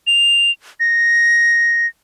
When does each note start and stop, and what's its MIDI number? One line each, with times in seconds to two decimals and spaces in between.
0.07 0.51 101
0.80 1.87 94